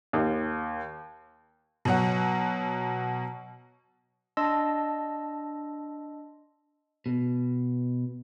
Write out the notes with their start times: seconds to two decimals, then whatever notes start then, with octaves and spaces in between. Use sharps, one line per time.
0.13 D#2
1.85 B2 F#3 F#5
4.37 D4 D#5 A5 C6 E6 A#6
7.06 B2